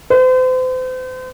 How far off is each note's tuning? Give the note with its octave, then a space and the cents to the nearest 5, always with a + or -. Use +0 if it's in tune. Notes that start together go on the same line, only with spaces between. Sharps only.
C5 -40